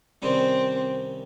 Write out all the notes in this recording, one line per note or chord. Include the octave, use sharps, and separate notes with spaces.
C2 C3 D#3 G3 C4 C#4